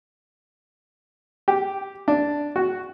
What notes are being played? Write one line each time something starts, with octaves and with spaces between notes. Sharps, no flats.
G4
D4
F#4